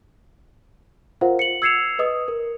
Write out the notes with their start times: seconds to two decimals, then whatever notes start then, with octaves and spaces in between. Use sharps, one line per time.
1.21 F4 A#4 C5 F5 F#5
1.39 C#7 F#7
1.62 E6 G#6 C7 C#7 E7 F7
1.99 B4 D#5 D#6
2.28 A#4